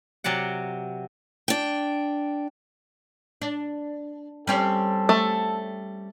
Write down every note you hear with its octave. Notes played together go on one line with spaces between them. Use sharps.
C3 F#3 D5 F#5
D4 G5
D4
G3 C4 C#4 A4
A3